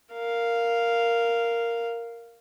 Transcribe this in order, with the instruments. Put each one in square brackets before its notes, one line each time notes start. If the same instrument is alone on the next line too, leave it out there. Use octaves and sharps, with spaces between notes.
[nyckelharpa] A#4 F5